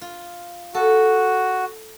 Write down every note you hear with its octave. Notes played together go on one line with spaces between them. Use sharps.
F4
F#4 A4